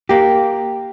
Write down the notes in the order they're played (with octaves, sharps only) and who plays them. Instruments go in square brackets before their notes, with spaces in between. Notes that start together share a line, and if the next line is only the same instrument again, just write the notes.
[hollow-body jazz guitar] A#3 G4